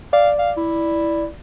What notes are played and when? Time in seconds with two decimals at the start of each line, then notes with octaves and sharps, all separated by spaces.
0.13 D5 F5
0.39 F5
0.57 E4